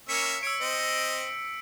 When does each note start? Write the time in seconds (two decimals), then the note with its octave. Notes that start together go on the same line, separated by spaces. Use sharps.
0.09 A#3 C#4 E5 B6 C#7
0.43 C#5 E6 D7
0.61 C4 D#5